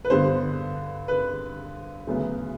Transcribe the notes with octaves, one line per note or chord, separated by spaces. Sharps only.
B4
G2 D3 G3 B3 C5
B4
D2 C#3 F#3 B3